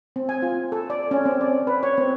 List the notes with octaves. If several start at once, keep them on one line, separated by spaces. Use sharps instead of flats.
C4
G#5
F4
A4
D5
C#4
C4
D5
B4
C#5
C4